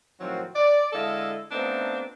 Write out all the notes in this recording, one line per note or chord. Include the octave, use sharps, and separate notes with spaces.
A2 D#3 F3 F#3 C4 F#4
D5
D3 G#3 E4 A4 D#5 F5
A3 B3 C4 D4 D#4 F4